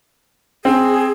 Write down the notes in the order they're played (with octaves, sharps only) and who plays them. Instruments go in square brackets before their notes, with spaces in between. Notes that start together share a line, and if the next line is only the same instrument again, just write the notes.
[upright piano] C4 [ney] G#4